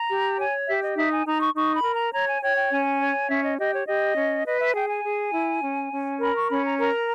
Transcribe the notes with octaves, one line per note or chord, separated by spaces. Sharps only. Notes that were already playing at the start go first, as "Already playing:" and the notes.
Already playing: A#5
G4
C#5 G#5
G4 E5
D#5
D#4 E5
G#5
D#4 A#5
C#6
D#4 C#6
B5
A#4
A#5
C#5 A#5
G#5
C#5 G5
G5
C#4 G#5
C#5
C#4 E5
D#5
G4 D#5
C#5
G4 D#5
C#4
B4 D#5
E5
G#4 G5
G#5
G#4
E4
C#4
C#4
A#4 B5
C#6
C#4 B5
A#5
A#4 A#5